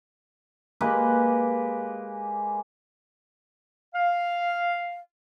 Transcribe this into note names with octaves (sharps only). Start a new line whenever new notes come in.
G#3 A#3 G4 B4
F5